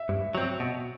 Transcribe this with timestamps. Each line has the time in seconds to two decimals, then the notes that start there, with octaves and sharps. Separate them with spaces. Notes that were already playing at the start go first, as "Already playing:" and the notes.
Already playing: E5
0.09 G2
0.35 F#3 C4
0.60 B2